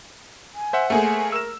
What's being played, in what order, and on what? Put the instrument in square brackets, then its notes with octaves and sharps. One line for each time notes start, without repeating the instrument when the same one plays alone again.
[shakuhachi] G#5
[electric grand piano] C5 E5 F#5
[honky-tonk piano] A3 A#3 G#4 [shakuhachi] G#5
[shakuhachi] A#4 [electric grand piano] E6 E7